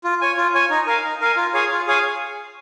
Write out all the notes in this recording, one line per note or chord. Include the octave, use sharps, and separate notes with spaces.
F4
C#5 G#5
F4
C#5 G#5
D#4
A#4 F5 G#5
D#4
A#4 F5 G#5
F4
G#4 C#5 F5 G#5
F4
G#4 C#5 F5 G#5